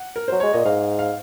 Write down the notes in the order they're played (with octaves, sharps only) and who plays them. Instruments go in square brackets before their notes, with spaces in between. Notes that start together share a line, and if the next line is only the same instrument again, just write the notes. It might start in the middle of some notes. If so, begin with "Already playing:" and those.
Already playing: [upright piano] F#5
A#4
[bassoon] F#3 [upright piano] C5
[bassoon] G#3 [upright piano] C#5
[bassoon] A#2 [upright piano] D#5
[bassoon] G#2 [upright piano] F5
[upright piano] F5